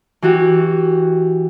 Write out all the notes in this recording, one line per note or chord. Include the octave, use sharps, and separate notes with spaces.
E3 F#4 G4